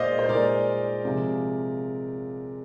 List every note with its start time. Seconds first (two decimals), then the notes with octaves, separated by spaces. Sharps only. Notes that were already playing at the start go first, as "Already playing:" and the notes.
Already playing: A#2 G#3 C5 D5 D#5 F5
0.19 C5
0.28 A#2 G#3 A#4 D5
1.05 C3 F3 G#3